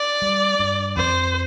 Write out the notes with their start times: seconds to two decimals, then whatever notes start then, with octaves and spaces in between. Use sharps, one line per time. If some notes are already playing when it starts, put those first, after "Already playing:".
Already playing: D5
0.22 G3
0.59 G2
0.96 F2 C5